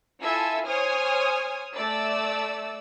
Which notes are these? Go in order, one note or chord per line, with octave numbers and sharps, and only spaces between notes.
E4 F4 A4 E5 G#5 E6
C5 C#5 G#5 D#6 F6
A3 D5 E6